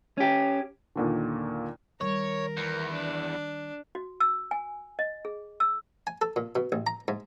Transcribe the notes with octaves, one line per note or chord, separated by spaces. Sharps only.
C#4 G4
D#2 A#2 D3
D#3 G3 A#4 C#5
E2
D4
F#4
E6
G#5
D#5
G#4
E6
G#5
A4
A#2
B2
A1
A#5
G#2